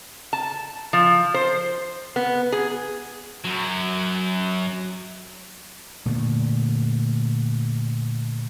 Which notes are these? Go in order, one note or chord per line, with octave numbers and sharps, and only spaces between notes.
A5
F3
C5
B3
G#4
F#2 F#3
A#2 D3 A3